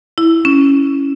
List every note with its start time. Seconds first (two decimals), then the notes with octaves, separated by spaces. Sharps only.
0.18 E4
0.45 C#4